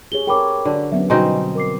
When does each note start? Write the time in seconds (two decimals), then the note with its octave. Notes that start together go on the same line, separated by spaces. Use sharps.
0.12 G4 G#4 C#5 G7
0.27 A4 A#4 C#5 G5 B5 D6
0.65 D3 F#4
0.92 F#3 B3 C#4 E5
1.10 B2 D3 G3 C4 D#4 D#5 G#5
1.55 A#4 D6 C7